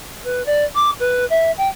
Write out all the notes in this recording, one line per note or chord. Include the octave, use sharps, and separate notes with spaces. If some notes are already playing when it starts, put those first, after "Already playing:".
B4
D5
D6
B4
E5
G5